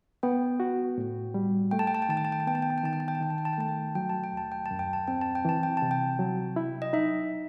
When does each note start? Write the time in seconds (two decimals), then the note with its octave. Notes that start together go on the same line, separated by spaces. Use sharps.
0.23 B3 G5
0.60 F#4
0.98 A2
1.34 G3
1.71 A3 G5
1.79 A5
1.87 G5
1.95 A5
2.02 G5
2.09 D#3 A5
2.17 G5
2.25 A5
2.32 G5
2.40 A5
2.47 B3 G5
2.55 A5
2.62 G5
2.70 A5
2.78 G5
2.83 D#3 A5
2.93 G5
3.00 A5
3.08 G5
3.15 A5
3.21 D#3 G5
3.30 A5
3.38 G5
3.45 A5
3.53 G5
3.58 A3 A5
3.68 G5
3.95 F#3 G5
4.10 A5
4.24 G5
4.33 D#2 A5
4.52 G5
4.66 A5
4.71 F#2
4.79 G5
4.93 A5
5.08 C4 G5
5.21 A5
5.35 G5
5.45 E3 A5
5.63 G5
5.77 C3 A5
5.91 G5
6.19 F#3
6.56 E4
6.82 D#5
6.93 D#4 E5